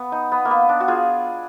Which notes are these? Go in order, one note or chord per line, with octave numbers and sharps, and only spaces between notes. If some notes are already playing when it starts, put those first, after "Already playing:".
Already playing: B3
D#4
B3
A#3
B3
D4
F#4
F4 G#4